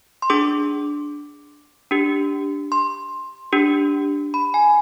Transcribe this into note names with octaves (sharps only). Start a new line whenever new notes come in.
C6
D4 G#4 D6
D4 G4
C6
D4 G4
B5
G#5